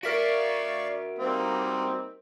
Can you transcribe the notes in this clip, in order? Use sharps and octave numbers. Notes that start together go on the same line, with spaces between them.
F#4 A#4 D5 E5 F5 C#6 B6 D7
G3 A#3 C4 D#4